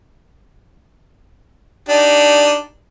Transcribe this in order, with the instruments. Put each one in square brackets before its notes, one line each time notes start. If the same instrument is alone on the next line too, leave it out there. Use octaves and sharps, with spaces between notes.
[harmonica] D4 D#4 G4